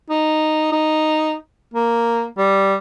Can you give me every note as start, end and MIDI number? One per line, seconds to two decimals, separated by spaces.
0.10 0.68 63
0.72 1.35 63
1.74 2.25 58
2.38 2.75 55